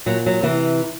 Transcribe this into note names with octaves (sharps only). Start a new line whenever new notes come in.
A#2 F#3
F#3
C3 E3